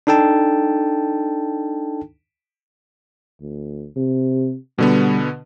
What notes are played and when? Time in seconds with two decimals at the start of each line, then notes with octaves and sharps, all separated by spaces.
0.07 D4 D#4 A4 G5 A5
3.41 D2
3.96 C3
4.78 B2 D3 G3 B3